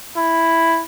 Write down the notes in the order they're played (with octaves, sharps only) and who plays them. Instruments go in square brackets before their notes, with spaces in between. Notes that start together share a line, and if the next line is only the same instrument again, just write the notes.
[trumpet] E4